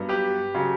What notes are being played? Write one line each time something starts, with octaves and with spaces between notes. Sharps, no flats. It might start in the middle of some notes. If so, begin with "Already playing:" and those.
Already playing: G2 F#3 B3
G4 B4
C#3 F#3